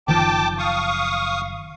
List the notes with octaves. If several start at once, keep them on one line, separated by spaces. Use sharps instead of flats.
F#1 D#3 F3 G5 A5 D6
F5 C#6 D#6